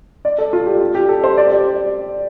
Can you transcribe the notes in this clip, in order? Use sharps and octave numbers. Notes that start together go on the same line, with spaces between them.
D5
A4
F4
G4
F4
G4
A4
C5
D5
G4